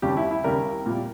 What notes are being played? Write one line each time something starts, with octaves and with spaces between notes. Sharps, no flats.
D#2 C#3 G3 G4
E4
E4
D#2 C#3 G3 A#4
A#2 G3